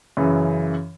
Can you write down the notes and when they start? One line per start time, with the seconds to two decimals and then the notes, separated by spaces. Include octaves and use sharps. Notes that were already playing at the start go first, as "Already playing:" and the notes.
0.17 F#2 C#3 E3